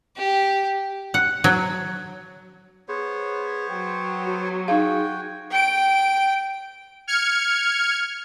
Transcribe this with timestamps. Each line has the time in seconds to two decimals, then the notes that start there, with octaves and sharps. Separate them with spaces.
0.16 G4
1.14 F#5
1.44 F#3
2.88 B3 G#4 C5 C#5
3.70 F#3 G5
4.26 F#4
4.68 D#4 F#4 G#4 F5 G5 G#5
5.50 G5 D7
7.07 F6 G#6 C#7